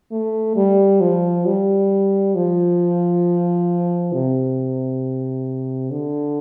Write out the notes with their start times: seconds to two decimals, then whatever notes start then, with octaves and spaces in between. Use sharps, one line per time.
0.12 A3
0.56 G3
1.01 F3
1.46 G3
2.35 F3
4.13 C3
5.90 D3